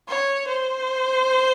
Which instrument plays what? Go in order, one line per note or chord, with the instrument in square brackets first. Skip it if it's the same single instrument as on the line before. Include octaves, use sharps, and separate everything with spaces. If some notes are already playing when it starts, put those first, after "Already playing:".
[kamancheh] C#5
C5